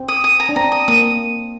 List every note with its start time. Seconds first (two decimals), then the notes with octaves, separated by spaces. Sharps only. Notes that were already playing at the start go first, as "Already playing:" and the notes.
Already playing: C4
0.08 D#6
0.24 D#6
0.40 A#5
0.49 D4
0.56 C4 A#5
0.72 D#6
0.88 A#3 D#6